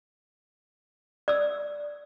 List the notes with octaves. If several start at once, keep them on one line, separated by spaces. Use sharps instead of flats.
D5 E6